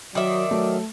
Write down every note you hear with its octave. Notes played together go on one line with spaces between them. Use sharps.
D#3 F#3 D5 E5
F#3 A3